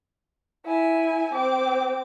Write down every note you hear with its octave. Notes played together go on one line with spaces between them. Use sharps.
E4 G#5
C4 D6